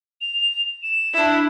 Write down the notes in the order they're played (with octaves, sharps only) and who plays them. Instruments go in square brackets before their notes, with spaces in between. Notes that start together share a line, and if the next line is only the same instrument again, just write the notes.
[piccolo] F7
E7
[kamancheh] D4 E4